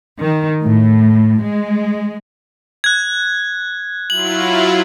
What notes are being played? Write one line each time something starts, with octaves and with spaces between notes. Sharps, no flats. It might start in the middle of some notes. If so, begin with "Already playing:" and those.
D#3
A2
G#3
F#6 G#6
F#3 E4 F4 F#7